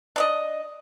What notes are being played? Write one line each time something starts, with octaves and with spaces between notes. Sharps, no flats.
D4 D5 D#5